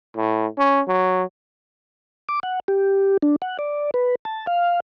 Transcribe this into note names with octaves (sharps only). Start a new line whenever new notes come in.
A2
C#4
F#3
D6
F#5
G4
D4
F#5
D5
B4
A5
F5